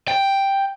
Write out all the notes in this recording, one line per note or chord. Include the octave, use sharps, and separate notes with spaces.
G5